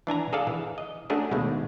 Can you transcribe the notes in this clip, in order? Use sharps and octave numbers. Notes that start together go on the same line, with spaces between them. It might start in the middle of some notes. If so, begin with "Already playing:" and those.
E3 D4 G#5 A#5
G#4 A4 D5 F5 A5
E3
D#5
A3 C#4 D4 F#4 G#4 A#4
D#2 B2 G#3 A3